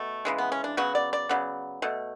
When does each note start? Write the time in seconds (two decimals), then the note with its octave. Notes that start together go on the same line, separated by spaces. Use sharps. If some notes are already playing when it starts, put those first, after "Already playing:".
Already playing: B2 A3
0.25 C#3 E3 G#3
0.38 B3
0.52 C#4
0.64 D4
0.77 C#3 F#3 B3 F#4
0.95 D5
1.13 D5
1.29 C#3 F#3 B3
1.82 B2 A3